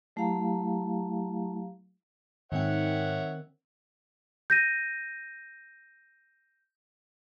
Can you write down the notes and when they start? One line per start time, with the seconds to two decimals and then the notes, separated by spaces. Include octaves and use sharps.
0.16 F#3 A3 E4 G4 F5 A#5
2.52 G#2 D#3 C4 C#5 E5 F#5 G5
4.50 G6 A#6 D#7